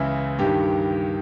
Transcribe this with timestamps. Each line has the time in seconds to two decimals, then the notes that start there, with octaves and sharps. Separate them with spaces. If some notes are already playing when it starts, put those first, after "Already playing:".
Already playing: C#2 C#3 E3 E4
0.39 G2 D#3 G4